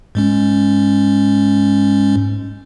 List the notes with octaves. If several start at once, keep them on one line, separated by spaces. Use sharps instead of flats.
G#2 G#3 C#4